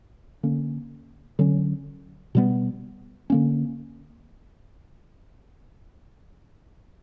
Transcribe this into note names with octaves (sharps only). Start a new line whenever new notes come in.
D3 A#3 C#4
D3 F#3 C#4
B2 G3 B3
D3 A#3 C#4